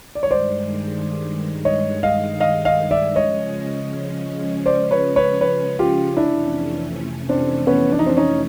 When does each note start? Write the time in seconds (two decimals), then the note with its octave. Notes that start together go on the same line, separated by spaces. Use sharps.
0.15 G2 D#3 G#3 D5
0.23 C#5
0.31 C5 D5
1.65 C#5 D#5
2.03 D#5 F5
2.40 D#5 F5
2.65 D#5 F5
2.91 D5 E5
3.16 C#3 F3 G#3 C#4 C#5 D#5
4.66 C5 D5
4.91 B4 C#5
5.16 B4 C#5
5.41 B4 C#5
5.79 F4 G4
6.17 F2 C3 E3 A3 C#4 D4 E4
7.29 C4 D4
7.67 B3 C#4
7.92 D4
7.99 D#4
8.06 C4 D4
8.17 C#4 D#4